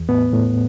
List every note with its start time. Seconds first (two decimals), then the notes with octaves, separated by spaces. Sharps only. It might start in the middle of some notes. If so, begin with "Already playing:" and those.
Already playing: E2
0.09 A2 B3
0.33 A2